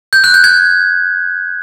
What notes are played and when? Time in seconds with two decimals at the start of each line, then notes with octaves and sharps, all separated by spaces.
0.13 G6
0.24 F#6
0.34 G6
0.44 G#6